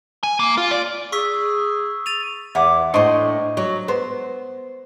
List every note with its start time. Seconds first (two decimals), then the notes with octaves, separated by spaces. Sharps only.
0.23 G#5
0.40 A#3
0.58 F4
0.71 D5
1.12 G#4 C#6 E6 B6
2.06 A6 D#7 F7
2.55 E2 E4 F#5 D6
2.94 A2 D4 C5 D#5 C#6
3.57 F#3
3.88 B3 C5